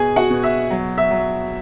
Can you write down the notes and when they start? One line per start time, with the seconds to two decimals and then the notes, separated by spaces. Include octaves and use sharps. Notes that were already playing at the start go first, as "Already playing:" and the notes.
Already playing: B2 G#4 G#5
0.16 F#4 F#5
0.30 B2
0.43 E5
0.70 F#3
0.98 E5
1.11 F#3